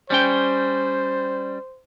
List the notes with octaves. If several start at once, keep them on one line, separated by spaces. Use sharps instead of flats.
G3 C#4 C5 G5